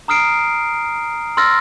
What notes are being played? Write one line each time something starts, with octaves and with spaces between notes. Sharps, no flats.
A#5 D#6 F6 C7 D7
C6 E6 F6 A6 A#6